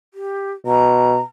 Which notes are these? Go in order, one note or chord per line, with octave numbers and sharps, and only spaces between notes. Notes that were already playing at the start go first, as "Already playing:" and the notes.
G4
B2 A#5